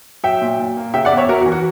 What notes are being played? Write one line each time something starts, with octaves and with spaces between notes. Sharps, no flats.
F#3 E5 G5
A#2
A#2
A#3
C#3 E5 G5
D5 F#5
E2
C#5 E5
E2 F#4 A#4
F#4
E3
F#4